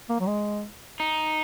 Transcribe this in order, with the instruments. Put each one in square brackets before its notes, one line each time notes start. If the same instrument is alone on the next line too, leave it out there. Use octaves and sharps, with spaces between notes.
[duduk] A#3
F#3
G#3
[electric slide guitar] D#4